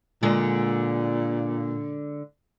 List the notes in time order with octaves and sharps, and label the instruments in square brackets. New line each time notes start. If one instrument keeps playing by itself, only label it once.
[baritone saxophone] A#2 [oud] D3 G#3